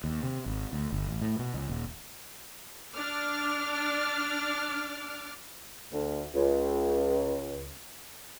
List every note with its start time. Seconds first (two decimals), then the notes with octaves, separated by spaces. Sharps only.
0.04 D#2
0.23 C3
0.46 G#1
0.73 D2
0.92 G1
1.07 A1
1.22 A2
1.39 B2
1.54 C#2
1.69 D#1
2.95 D4 D6 F6
5.93 D2
6.35 C#2